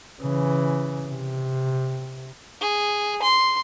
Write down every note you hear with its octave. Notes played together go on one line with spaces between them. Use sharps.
C#3 E3
C3
G#4
C6